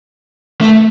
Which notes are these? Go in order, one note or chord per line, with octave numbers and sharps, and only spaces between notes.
A3